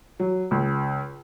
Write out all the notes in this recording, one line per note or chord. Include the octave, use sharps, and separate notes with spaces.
F#3
C#2